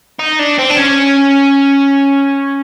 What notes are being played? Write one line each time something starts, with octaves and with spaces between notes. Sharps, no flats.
D#4
D4
C4
D4
C#4